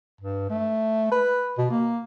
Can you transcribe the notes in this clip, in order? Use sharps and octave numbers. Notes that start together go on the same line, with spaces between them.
G2
A3
B4
B2
A#3